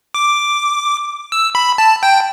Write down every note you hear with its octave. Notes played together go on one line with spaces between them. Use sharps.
D6
E6
B5
A5
G5